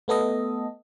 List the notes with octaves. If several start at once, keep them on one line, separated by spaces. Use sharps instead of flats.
A3 B3 A4 D#5